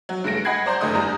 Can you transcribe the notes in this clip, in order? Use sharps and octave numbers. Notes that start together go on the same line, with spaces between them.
F#3
G2 C#3 A3 A#6 D7
D#5 F#5 G#5 B5 G#6 C7
C5 D5 A#5 C6 G6
F#1 D3 A3 D#5 D#6
E2 G3 D4 A#5